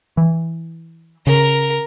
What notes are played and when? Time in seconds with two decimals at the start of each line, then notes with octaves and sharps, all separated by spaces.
0.17 E3
1.27 C#3 A#4